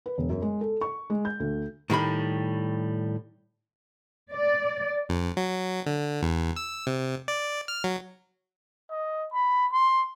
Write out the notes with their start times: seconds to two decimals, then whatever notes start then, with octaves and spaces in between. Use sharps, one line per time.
0.06 B4
0.18 E1
0.30 F#2
0.42 G#3
0.61 A4
0.81 C#6
1.10 G#3
1.25 G6
1.40 D2
1.90 A2 D#3 G3 B5
4.34 D5
5.09 F2
5.37 F#3
5.86 D3
6.22 E2
6.56 E6
6.87 C3
7.28 D5
7.68 F6
7.84 F#3
8.90 D#5
9.32 B5
9.72 C6